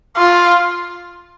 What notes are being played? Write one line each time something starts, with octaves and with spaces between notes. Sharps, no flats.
F4